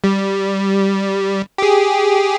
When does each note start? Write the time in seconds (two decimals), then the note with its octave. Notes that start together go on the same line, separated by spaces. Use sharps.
0.04 G3
1.58 G4 G#4